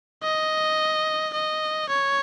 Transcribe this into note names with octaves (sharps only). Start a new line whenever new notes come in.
D#5
D#5
C#5